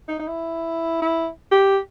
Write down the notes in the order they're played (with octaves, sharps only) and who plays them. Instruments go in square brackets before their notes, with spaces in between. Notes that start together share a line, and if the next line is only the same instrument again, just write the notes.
[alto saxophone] D#4
D#4
E4
E4
G4